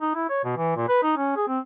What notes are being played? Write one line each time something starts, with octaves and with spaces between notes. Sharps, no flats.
D#4
E4
C#5
B2
E3
A#2
B4
D#4
C#4
G#4
C4